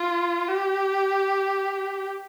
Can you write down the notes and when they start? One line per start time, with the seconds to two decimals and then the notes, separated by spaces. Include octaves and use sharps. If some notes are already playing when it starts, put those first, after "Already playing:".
Already playing: F4
0.48 G4